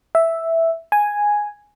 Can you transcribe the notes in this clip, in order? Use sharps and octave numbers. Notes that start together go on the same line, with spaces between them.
E5
G#5